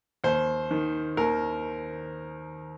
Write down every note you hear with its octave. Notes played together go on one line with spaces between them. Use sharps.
D#2 C5
D#3
D#2 A#4